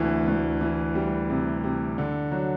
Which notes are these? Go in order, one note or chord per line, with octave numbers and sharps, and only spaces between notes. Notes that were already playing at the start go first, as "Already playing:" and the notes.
Already playing: D2 C3 E3
D2
E3
G3
C3
C3
D3
F#3